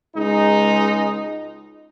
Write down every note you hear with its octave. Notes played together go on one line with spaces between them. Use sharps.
C#2 G#3 D#4